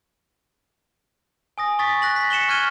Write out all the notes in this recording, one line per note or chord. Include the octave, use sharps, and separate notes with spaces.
G#5 D#6 A#6
C#6 D#6 A6 B6
F#6 A#6 F#7
B6
C#7 E7 F#7 G7
C#6 F6 F#6 G#6 D#7 G7